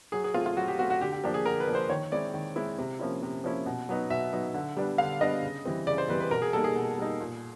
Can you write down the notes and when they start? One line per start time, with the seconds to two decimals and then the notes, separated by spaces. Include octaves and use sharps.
0.12 F#3 G#4
0.24 G#4
0.34 C4 F4
0.37 A3
0.46 F4
0.57 F#3 F#4
0.68 G4
0.79 A3 C4 F#4
0.90 F#4
1.01 D3 G4
1.12 G4
1.24 F3 A#3 D4 G4
1.34 G#4
1.45 D3 A#4
1.60 B4
1.67 F3 A#3 D4
1.75 C5
1.90 D#3 C#5
2.12 G#3 C4 E4 D5
2.34 D#3
2.56 G#3 C4 E4
2.78 C3
2.99 F3 A#3 C#4 E4
3.22 C3
3.44 F3 A#3 C#4 E4
3.66 B2
3.89 F#3 B3 D#4
4.10 B2 E5
4.33 F#3 B3 D#4
4.54 D3
4.77 G3 B3 D4
4.98 D3 F5
5.21 G3 B3 D4 D#5
5.43 C#3
5.65 E3 G3 C4
5.87 C#3 D5
5.98 C5
6.09 E3 G3 C4 B4
6.20 B4
6.31 B2 A#4
6.42 G#4
6.53 G3 A#3 D#4 A4
6.64 G#4
6.75 B2
6.98 G3 A#3 D#4
7.20 A#2